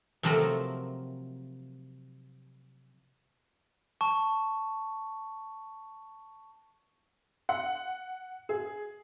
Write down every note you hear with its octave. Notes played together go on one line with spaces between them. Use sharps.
C3 F3 F#3 A3 C4 A#4
A5 C#6
F#5
G#4